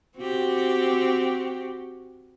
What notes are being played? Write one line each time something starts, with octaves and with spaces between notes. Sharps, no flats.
C4 F#4 G4